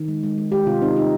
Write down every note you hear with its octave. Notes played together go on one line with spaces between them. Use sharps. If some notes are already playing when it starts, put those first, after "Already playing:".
Already playing: D#3
G#3
G#3
G#3
G#3 G4
C3 F4
C4 D#4
C4 D#4